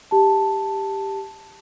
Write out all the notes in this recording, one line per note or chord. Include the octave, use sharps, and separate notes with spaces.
G4 A5